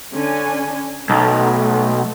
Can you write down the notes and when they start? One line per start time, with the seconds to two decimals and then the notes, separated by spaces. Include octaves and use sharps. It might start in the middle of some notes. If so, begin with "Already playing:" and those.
0.13 D3 C#4 G#5
1.10 B1 A3